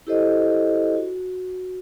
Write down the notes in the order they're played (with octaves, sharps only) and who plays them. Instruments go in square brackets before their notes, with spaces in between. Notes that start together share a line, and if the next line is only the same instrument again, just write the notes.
[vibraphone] E4 G4 A4 C5 D#5
F#4